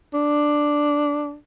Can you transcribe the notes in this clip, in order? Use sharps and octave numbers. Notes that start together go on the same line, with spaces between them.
D4